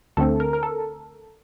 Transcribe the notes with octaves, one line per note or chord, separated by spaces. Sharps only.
D2 D3 A3 C4 A4
A#4
A#4
A4